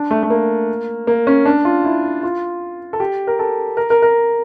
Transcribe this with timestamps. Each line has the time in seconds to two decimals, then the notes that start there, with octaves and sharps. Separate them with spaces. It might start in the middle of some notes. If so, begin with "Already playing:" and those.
Already playing: D4
0.11 A3
0.23 A3
0.30 A#3
1.07 A#3
1.27 C#4
1.46 D4
1.65 F4
1.84 E4
2.23 F4
2.93 A4
3.00 G4
3.27 A#4
3.39 A4
3.77 A#4
3.90 A#4
4.02 A#4